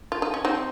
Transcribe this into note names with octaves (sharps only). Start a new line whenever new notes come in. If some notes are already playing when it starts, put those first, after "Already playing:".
F4
D#4
C#4
C4 D#4